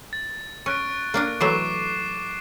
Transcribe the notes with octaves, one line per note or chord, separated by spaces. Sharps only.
A6
C#4 C#6 F#6 D7
A#3 D4 A#4
E3 F#3 A3 D6 C7 E7